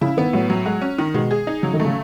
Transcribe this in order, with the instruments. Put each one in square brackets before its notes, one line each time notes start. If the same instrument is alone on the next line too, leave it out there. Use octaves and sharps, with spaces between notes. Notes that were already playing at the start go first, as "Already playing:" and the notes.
[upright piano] C#3 [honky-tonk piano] E4
[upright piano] D#3 [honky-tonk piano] B3
[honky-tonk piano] A2 [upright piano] F#3
[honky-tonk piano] F#3
[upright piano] G#3 [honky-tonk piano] F#4
[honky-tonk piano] C#4
D#3
[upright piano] B2 [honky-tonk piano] G#3
[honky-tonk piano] G#4
D#4
[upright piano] C#3 [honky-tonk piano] F#3
[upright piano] D#3
[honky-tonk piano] A3
[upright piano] C#3